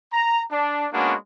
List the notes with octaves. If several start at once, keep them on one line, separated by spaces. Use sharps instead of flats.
A#5
D4
G#3 A#3 B3 C#4 D4 F#4